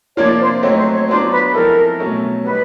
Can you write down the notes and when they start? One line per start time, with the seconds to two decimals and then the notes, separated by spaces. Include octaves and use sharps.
0.17 C3 F3 A#3 D4 F4 C#5
0.39 C5
0.63 F#3 A3 C4 D#4 F#4 C#5
0.77 C5
0.94 C#5
1.08 F#3 B3 D4 F4 C5
1.31 B4
1.53 F3 G#3 C4 E4 A4 A#4
1.99 B2 F#3 A3 C#4
2.44 G3 B3 D#4 B4